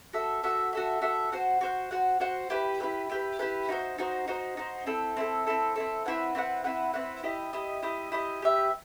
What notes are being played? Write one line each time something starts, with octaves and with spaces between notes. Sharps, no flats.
F#4 A4 E5
F#4 A4 E5
F#4 A4 E5
F#4 A4 E5
F#4 C5 F#5
F#4 C5 F#5
F#4 C5 F#5
F#4 C5 F#5
E4 G4 B4
E4 G4 B4
E4 G4 B4
E4 G4 B4
D#4 F#4 C5
D#4 F#4 C5
D#4 F#4 C5
D#4 F#4 C5
C4 E4 A4
C4 E4 A4
C4 E4 A4
C4 E4 A4
C4 E4 B4 F#5
C4 E4 B4 F#5
C4 E4 B4 F#5
C4 E4 B4 F#5
E4 G4 D#5
E4 G4 D#5
E4 G4 D#5
E4 G4 D#5
G4 B4 E5